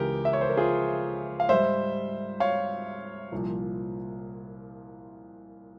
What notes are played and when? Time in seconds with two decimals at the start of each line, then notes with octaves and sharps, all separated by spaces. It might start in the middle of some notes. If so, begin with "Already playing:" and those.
Already playing: C#2 C#3 E3 G4 A#4
0.25 E5
0.33 C#5
0.41 C5
0.49 A#4
0.57 F4 G#4
1.40 F5
1.49 G#2 G3 C5 E5
2.40 C#5 F5
3.32 C2 A#2 F3